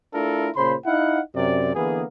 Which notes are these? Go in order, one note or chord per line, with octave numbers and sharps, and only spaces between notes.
A3 D4 E4 F4 A4 A#4
A#2 C#3 C5 B5 C6
D#4 E4 F5 F#5
F#2 C3 D5
D3 E3 A#3 B3 G#4